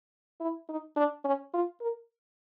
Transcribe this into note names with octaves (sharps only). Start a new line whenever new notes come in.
E4
D#4
D4
C#4
F4
A#4